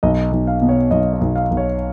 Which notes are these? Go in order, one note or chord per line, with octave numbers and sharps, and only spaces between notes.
B1 D#5
B1
F5
B2
C#5
B1 D#5
D#5
B1
F5
B1
C#5